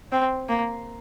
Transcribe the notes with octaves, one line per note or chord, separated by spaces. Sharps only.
C4
A#3